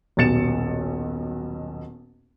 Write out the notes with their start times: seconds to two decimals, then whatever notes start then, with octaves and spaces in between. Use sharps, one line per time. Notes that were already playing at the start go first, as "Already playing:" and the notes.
0.17 D#1 B1 B2 A6 C#7 E7